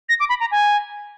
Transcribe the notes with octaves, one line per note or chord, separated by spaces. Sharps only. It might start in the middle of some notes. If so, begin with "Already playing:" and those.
A#6
D6
B5
A#5
G#5